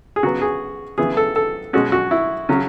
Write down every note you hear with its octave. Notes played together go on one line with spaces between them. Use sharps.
G#4
C#3 F#3 B3 F#4
G#4
C#3 E3 B3 G#4
A4
A4
B2 G#3 C#4 F#4
F#4
E4
C#3 F#3 C#4